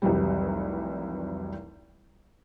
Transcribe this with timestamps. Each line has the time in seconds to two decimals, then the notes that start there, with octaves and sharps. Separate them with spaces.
0.02 F1 C2 C3 E3 F#3 G3